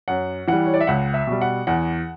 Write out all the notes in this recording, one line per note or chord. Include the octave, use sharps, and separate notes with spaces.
F#2 F#5
E3 G3 F#5
C#5
D5
E5
C#2 F#5
E5
B2 G3
F#5
E2 F#5